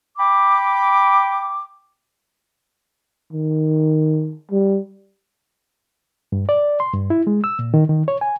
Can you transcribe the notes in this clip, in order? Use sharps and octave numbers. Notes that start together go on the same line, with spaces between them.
G5 B5 D6
D#3
G3
G2
D5
C6
G2
E4
G#3
E6
A#2
D#3
D#3
C#5
G#5